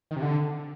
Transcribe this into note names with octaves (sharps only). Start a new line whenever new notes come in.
D#3
C3
D3